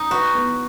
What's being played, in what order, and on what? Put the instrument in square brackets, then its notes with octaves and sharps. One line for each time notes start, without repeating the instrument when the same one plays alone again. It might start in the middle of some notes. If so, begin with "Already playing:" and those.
Already playing: [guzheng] D#4
[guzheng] F#4 [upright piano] B4
[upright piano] B3